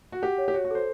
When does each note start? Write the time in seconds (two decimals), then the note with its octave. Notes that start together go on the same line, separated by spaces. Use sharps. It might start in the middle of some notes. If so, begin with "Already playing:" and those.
0.12 F#4
0.22 G4 F#5
0.38 C#5
0.48 G4
0.54 F#4 C#5
0.65 F#4
0.71 A4 C5